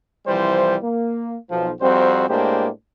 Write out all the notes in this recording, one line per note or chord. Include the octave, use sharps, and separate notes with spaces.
C2 E3 F3 G3 C5
A#3
B1 F3
F2 G3 C4 F#4 C5
A2 G#3 A#3 D4 G4 C5